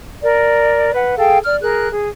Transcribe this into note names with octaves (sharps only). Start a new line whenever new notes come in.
A#4 D5
B4 F#5
G#4 A4 F5 G5
D5 F6
G#4 A#4 F#6
G#4